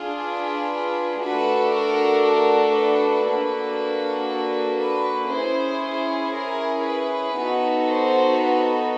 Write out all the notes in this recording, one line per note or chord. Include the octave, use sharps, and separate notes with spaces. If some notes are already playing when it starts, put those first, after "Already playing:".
Already playing: D4 F4 G#4
B4
A3 D4 F#4 A4 B4
A#4
A#4
B4
A#3 D4 F#4 A4
B4
C#4 E4 G#4 C5
C5
A#4
B4
B3 D#4 F#4 A4
C5
B4